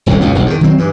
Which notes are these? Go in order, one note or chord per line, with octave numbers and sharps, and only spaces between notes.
D#1 C2 F2 A2
C#2 F#2 B2
E1 B1
E2 G#2 D#3
D#3 F#3 C4
G2 E3